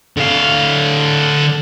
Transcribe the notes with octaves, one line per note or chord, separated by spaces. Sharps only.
D3 F5